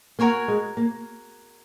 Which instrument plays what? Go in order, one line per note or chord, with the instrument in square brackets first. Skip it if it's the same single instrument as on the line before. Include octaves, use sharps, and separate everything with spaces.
[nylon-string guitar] A#3 [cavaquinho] F#4 A#4 C#5 G#5
[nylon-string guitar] G#3
A#3